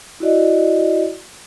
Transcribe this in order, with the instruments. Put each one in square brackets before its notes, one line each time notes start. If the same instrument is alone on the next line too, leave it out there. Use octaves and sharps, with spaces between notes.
[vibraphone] E4 F#4 D5 D#5